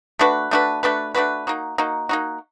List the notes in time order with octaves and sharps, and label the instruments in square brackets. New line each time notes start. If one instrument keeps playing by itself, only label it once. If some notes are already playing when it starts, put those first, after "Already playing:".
[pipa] A3 D4 F#4 B4
A3 D4 F#4 B4
A3 D4 F#4 B4
A3 D4 F#4 B4
A#3 D#4 F#4
A#3 D#4 F#4
A#3 D#4 F#4